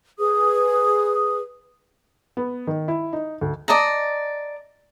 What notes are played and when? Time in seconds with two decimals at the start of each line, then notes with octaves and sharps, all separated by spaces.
0.19 G#4 B4 D#6
2.37 B3
2.67 D#3
2.88 E4
3.13 D#4
3.41 D2
3.68 D5 D#5 A5 A#5